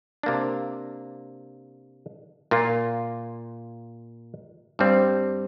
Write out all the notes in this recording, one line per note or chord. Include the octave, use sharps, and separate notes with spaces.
C3 A#3 D4
A#2 A#3 F4
G2 G3 C4